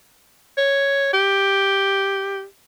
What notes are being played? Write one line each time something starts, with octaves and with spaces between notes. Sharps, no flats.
C#5
G4